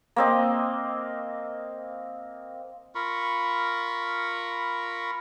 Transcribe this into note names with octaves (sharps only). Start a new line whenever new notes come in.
A#3 C4 D#5
F4 A#4 B5 C#6